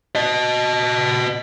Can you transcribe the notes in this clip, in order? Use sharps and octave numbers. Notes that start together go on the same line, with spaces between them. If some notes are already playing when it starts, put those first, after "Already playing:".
F#4 D#5